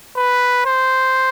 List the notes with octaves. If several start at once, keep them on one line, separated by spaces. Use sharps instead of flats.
B4
C5